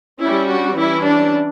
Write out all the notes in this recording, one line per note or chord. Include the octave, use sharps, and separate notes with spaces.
G3 C#4 E4
D4 F#4
E3 G3 C#4 E4
D4